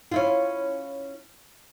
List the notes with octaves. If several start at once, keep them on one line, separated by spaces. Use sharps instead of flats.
C#4 E4 F4